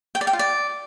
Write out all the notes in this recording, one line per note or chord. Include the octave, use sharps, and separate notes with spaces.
G5
D5
G5
F4
D5